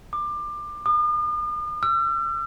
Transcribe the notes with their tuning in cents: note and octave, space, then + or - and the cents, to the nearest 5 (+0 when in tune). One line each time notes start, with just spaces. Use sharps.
D6 +25
D#6 -45
E6 +45